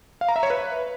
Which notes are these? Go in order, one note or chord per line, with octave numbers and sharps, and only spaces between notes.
F5
A#5
E5
C#5
B4